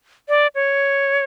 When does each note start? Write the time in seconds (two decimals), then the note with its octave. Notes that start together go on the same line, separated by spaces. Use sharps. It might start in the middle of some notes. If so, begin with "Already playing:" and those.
0.29 D5
0.55 C#5